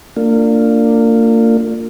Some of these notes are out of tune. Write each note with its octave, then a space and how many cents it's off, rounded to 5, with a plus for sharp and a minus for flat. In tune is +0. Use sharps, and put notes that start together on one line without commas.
A#3 -35 D4 +0 F4 +0